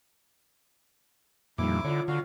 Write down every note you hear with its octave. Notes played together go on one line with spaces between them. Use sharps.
F2 A#2 D#3 G3 E4 D6
D3 F4 C#5
D3 F#4 F5